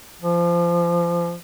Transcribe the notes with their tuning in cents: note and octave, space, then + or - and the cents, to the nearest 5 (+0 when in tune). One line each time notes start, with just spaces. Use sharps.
F3 -25